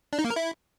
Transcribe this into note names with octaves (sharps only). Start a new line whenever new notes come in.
D4
D#4
A#3
A#4
E4